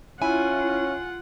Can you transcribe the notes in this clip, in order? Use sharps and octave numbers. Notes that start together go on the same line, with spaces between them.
C#4 E4 F4 F#5 G#5